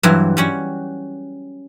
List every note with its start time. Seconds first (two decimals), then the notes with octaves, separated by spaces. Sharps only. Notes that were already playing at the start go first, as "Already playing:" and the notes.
0.03 G2 E3 F#3 C5
0.37 G3 C#4 F#4